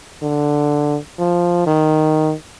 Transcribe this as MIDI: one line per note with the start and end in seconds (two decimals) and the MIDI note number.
0.23 0.97 50
1.19 1.63 53
1.67 2.33 51